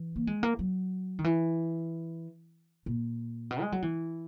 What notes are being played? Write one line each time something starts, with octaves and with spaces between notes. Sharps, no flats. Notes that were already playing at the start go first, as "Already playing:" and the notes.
Already playing: E3
A#3
G#3
A#3
F#3
D#3
E3
A#2
B2
G#3
F#3
E3